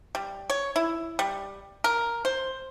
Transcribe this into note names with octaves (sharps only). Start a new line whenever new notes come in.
G3
C#5
E4
G3
A#4
C5